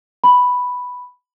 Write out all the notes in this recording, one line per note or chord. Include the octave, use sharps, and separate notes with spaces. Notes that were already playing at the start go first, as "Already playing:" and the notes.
B5